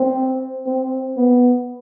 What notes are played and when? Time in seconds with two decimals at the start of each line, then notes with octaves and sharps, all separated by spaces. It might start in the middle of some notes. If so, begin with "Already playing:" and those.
Already playing: C4
0.66 C4
1.17 B3